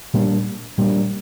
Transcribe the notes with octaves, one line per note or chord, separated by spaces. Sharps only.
A#2 G3 A#3 D4
A#2 G3 A#3 D4